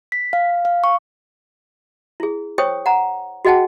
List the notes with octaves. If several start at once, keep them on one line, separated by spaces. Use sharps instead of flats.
B6
F5
F5
C#6
E4 G#4
C5 C#5 G5 C#6 D#6
F#5 A#5
F#4 G#4 D#5 F#5 G5 A5